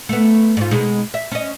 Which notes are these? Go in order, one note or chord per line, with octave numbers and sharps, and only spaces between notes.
A3 B3
G#2 F4
B2 G#3 D#4
E5
C#4 D#5